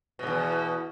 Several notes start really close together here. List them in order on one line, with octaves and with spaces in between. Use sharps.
B2 G#2 E2